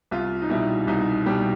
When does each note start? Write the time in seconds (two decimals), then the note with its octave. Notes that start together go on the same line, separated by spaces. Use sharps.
0.11 C2 F4
0.42 D#4
0.50 B2 G3 E4
0.87 C2 D#4
1.26 B2 G3 G4